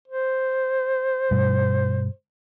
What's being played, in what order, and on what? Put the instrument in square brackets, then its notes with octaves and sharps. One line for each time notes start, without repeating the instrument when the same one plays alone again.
[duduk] C5
[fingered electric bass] G2 B2 G3